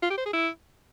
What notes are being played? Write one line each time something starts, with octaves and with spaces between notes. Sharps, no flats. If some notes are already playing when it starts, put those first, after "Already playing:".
F4
G4
C5
G#4
E4